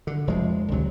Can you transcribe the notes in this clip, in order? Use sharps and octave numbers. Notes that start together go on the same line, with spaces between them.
D3
F1 F3 G#3
D2 C3 F#3